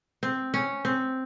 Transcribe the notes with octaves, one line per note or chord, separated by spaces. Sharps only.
C4
C#4
C4